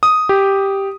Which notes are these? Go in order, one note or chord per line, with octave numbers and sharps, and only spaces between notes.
D#6
G4